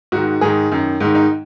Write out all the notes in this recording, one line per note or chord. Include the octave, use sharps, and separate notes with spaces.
G#2 D#3 F#4
G#2 D#3 G#4
F#2 D#3
G#2 D#3
D#4